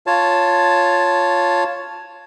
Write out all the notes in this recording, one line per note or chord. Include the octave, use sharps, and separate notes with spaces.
F4 C#5 A5